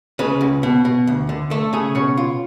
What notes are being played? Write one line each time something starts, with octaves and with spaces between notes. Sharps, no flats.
C#3 B4
C#2
B2
B2
D2
D3
A3 A4
C#3 G#4
B2 C#5
F4